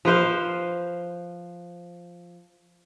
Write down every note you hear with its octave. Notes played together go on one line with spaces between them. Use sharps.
F3 B4 C5 F5